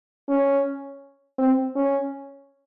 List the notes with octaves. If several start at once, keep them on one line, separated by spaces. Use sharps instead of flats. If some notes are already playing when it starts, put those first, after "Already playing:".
C#4
C4
C#4